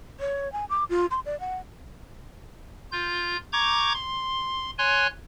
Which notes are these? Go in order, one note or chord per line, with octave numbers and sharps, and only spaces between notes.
C#5
G#5
D6
F4
C6
D5
F#5
F4 G6
A#5 C#6 D6 G6 G#6
C6
C#5 G#5 C6 F#6